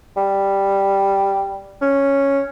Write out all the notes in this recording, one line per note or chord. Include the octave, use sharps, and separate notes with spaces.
G3
C#4